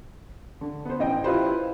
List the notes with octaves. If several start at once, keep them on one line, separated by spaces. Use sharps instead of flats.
D3
B3 C5
A1 D#5 G5
E4 F4 G4 B4 C5